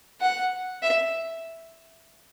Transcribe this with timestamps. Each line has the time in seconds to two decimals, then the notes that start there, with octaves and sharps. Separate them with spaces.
0.21 F#5
0.82 E5